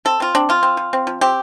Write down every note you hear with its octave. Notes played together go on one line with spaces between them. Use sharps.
C4 A4
C4 F4
C4 D4
F3 F4
C4
F3
C4
F3
C4 G4